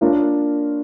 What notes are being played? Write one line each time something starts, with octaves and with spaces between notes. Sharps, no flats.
A#3 D4 F4 A#4 C#5